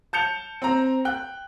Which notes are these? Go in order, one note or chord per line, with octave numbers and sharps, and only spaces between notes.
A5 G6 C#7 F7
C4 A#5
G5 F#6